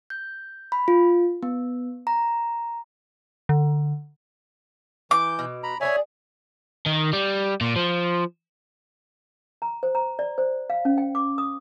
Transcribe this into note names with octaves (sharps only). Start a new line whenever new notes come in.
G6
B5
F4
B3
A#5
D3
E3 D6 G6
B2
A#5 B5
G#4 B4 C#5 D5 E5 G#5
D#3
G3
A#2
F3
A#5
C5
A#5
D5
C5
F5
C#4
G5
D6
D#6